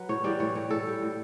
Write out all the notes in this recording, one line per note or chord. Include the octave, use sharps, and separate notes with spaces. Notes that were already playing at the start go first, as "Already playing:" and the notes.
Already playing: F#3 B4
A2 C#5
E3 G3 D5
A2 C#5
E3 G3 C#5
A2 A4
G3
A2